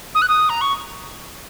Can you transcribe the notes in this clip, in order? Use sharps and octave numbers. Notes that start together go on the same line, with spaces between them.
D#6
F#6
D#6
A#5
C#6